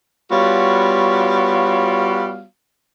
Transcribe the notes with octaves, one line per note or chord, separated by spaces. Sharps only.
G3 B3 F4 F#4 C#5 F5